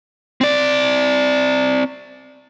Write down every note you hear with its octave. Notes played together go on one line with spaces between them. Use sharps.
C4 D5